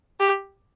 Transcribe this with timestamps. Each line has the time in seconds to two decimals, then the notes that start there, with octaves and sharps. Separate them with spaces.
0.20 G4